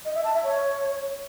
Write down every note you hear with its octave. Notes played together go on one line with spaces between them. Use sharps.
D#5
E5
A5
E5
C#5